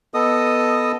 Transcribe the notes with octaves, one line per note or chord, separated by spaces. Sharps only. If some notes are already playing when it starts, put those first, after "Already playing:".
B3 A4 D#5 D#6